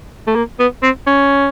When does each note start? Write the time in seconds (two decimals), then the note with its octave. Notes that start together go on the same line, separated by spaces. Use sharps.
0.28 A3
0.35 A#3
0.59 B3
0.83 C4
1.07 C#4